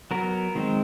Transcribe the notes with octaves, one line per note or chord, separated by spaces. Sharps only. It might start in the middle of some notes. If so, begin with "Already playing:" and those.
F#3 B3 A#4
D#3 G#3 C4